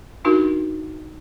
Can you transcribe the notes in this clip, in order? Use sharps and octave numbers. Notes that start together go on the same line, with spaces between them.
D4 D#4 F#4 G4 A#4